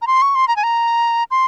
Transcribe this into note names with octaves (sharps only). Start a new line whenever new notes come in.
A#5
C6
C#6
C6
A#5
G#5
A#5
C6